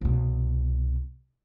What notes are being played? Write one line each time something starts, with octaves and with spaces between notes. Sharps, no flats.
C2 B2